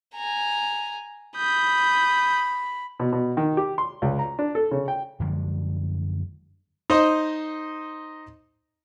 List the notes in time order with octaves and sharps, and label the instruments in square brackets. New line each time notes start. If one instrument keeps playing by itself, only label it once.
[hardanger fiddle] G#5 A#5
[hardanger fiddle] B5 [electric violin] D#6 G6
[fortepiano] B2
B2
D#3
G4
C6
C#2
A#5
D4
A4
C#3
G5
[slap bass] F#2 D3 F3 G#3
[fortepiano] D#4 C5 D#5